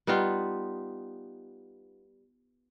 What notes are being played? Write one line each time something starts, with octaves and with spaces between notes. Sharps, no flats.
G3 B3 D#4 F4